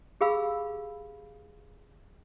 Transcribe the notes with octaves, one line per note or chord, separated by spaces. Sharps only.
G4 G#4 F5 B5 E6